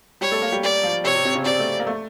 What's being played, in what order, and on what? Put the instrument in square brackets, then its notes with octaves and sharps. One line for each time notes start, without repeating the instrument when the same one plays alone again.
[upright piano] G3 G4 [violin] C#5
[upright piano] A3 A4
A#3 A#4
G3 G4
[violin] D5
[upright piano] F3 F4
[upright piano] C3 C4 [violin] C#5
[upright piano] C3 C4
C3 C4
C#3 C#4
[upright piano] C3 C4 [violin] D5
[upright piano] A3
A#3
A3